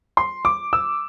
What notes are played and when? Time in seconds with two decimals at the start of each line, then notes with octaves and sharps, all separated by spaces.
0.17 C6
0.45 D6
0.73 E6